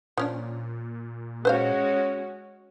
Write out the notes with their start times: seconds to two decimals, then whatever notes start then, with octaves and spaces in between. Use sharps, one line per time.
0.18 A#2 F3 C#4 D4
1.45 G#3 C#4 F#4 B4 C5 F5